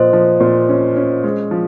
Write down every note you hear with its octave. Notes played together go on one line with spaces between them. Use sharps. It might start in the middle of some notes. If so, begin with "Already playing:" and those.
Already playing: A#2 F3 C5 D#5
F3
A#2
C#4
C#4
G#3
F3